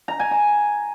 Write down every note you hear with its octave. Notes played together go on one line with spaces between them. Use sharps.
A#5
G#5
A#5